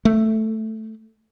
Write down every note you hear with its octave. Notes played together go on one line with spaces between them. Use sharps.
A3